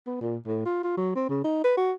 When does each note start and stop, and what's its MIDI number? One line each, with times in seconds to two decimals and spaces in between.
0.07 0.16 59
0.21 0.36 46
0.46 0.64 45
0.65 0.82 65
0.83 0.96 65
0.97 1.15 54
1.15 1.28 60
1.29 1.43 49
1.44 1.62 63
1.64 1.76 71
1.77 1.92 66